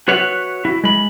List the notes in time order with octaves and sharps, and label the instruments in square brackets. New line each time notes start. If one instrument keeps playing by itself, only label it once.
[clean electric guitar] F#4 B4 C#5 E5 F#5
E4 F#4
G#3 B5